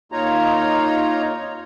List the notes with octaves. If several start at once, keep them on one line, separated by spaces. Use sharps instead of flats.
D#2 A#3 D#4 F4 C#5 A#5